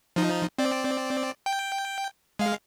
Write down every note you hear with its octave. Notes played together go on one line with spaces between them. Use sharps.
F3 D#4
C4 D5
G5
G#3 F5